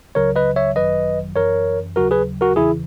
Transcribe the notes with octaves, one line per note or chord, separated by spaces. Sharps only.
C#2 C#3 F#3 A#4 C#5
B4 D#5
C#5 E5
G#1 F#2 D#3 F#3 B4 D#5
F#2 E3 A#4 C#5
D#2 C#3 F#3 F#4 A#4
G#4 B4
F#4 A#4
E2 C#3 E3 E4 G#4